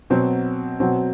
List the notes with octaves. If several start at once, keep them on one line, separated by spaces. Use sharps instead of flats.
B2 F#3 C4
B2 F#3 C4